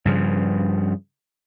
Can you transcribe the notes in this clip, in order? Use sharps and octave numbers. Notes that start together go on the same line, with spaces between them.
G2 C#3 F3